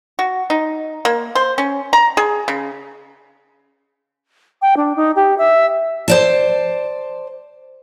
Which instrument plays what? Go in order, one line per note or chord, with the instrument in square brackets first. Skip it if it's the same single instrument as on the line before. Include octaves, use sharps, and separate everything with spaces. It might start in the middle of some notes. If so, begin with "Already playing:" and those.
[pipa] F#4
D#4
A#3
C5
C#4
A#5
G#4
C#3
[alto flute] G5
D4
D#4
G4
E5
[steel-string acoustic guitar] C5 D5 A5